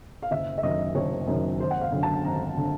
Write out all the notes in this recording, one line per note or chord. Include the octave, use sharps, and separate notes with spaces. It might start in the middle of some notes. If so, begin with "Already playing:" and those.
F5
F#1 E5
E5
F#2 D#3 D#5
F#1 C#5
F#2 D#3
G#1 C5
F#5
F5
F#2 D3
A5
G#1 A#5
D3